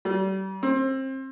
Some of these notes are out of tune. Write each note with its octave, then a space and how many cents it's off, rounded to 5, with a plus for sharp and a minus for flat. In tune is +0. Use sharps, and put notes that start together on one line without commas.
G3 -35
C4 +25